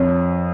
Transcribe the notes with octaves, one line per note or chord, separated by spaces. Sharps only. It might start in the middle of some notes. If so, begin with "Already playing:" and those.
Already playing: F2 C#5